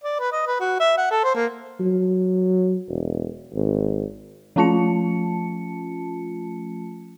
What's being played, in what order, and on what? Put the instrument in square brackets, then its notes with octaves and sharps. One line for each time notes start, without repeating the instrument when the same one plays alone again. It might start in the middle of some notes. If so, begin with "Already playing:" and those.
[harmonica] D5
B4
D#5
B4
F#4
E5
F#5
A4
C5
A#3
[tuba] F#3
E1
G#1
[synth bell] F3 A3 C#4 F4 A5 C#7